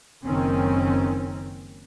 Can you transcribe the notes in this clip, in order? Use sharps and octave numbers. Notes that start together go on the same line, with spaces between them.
F#1 D#3 C4 C#4